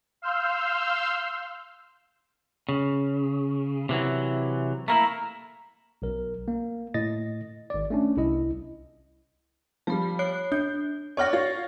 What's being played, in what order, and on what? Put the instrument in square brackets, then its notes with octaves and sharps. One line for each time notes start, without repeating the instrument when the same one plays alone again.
[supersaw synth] F5 C6 E6 F6 G6
[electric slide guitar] C#3
C3 E3 F#3
[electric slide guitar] A3 A#3 E4 [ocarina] A#5
[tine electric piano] B1 A#4
A#3
A2 D#5 A6 A#6
G#1 D5
A3 C#4 D4
C2 E4 D#5
[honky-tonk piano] F3 G3 [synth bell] A5 B5
[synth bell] C#5 F#6 C7
[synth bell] D4 [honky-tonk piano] G6
[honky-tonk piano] C#5 D5 F#5 [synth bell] C#6 F6 A#6
[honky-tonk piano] F4 C#5 [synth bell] A6